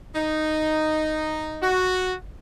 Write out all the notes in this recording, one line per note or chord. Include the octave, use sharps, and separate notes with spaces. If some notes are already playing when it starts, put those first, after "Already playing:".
D#4
F#4